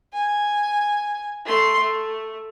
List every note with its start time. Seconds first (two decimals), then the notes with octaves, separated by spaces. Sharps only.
0.14 G#5
1.45 A3 C6
1.79 A3